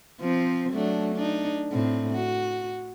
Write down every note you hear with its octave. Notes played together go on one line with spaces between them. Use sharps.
F3 C4
F#3 A3 D4
D4 D#4
A2 C4
F#4